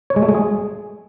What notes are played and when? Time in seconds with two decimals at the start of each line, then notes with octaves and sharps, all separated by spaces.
0.10 C#5
0.16 G#3
0.22 A3
0.28 G#3
0.35 G#4